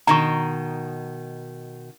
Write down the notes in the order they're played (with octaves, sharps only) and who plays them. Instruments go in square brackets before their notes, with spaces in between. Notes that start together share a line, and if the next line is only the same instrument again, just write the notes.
[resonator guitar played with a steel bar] B2 D#3 [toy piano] A#5 C#6